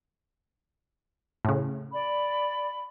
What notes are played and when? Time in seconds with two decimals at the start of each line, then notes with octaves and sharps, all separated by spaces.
1.45 A2 C#3
1.92 D5 B5